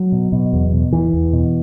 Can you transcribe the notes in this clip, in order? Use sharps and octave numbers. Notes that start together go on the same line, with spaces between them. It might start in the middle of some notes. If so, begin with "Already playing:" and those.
Already playing: F#3
B2
B2
E2
B2
E2 E3
E2
B2